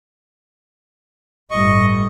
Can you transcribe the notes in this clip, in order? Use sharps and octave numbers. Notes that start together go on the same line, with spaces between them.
G1 A2 G3 D#5 C#6